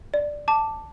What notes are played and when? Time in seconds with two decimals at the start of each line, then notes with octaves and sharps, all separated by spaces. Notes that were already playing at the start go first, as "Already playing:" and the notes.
0.14 D5
0.48 A5 D6